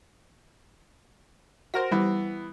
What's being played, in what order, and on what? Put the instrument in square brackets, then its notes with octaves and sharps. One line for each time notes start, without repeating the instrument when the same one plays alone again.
[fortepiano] F#4 A#4 [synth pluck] C5 A#6
[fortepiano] E3 B3 [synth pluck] G3